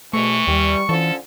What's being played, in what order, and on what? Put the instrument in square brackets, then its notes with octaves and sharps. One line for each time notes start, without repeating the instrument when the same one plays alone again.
[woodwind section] E2 G#2 B2 [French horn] E3 [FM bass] A3 [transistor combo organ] C#6
[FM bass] D#2 [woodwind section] G3
[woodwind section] D3 F3 C#4 [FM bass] E3 [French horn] A4